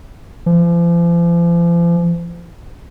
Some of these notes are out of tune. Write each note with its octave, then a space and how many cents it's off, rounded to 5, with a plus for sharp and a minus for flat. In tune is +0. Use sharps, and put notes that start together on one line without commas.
F3 -40